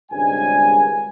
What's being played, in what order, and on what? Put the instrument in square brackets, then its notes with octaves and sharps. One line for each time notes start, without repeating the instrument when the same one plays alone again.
[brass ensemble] G#1 C#2 G3 D4 G#5